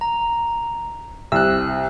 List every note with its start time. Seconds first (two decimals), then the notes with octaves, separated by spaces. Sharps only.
0.01 A#5
1.32 C2 C3 E6 F#6